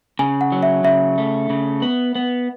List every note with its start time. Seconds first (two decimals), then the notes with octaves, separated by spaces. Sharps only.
0.19 C#3 G#5
0.41 F#5
0.52 F#3
0.63 E5
0.84 C#3 E5
1.18 A3
1.50 C#3
1.82 B3
2.15 B3